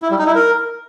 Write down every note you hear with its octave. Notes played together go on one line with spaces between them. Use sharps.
E4
G3
D#4
E4
A#4